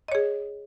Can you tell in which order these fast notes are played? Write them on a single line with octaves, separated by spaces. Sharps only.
D#5 C#5 G#4